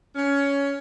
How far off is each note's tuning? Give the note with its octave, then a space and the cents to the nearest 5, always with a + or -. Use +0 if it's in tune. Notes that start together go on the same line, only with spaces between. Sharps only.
C#4 +15